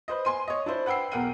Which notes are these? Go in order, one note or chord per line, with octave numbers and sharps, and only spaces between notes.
B4 C5 D#5
G#5 C6 D#7
C#5 D#5
D4 E4 C5
B4 F#5 G5 E6 C7
B1 E2 A#4 F#5 G5 D#7